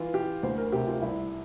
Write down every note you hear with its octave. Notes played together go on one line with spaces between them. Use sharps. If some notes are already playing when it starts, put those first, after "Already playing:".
Already playing: E3 F4
E3 G4
D2 C5
A#4
C3 G4
F4
C2 E4